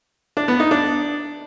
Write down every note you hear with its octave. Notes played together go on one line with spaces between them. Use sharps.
D4
B3
D#4
D4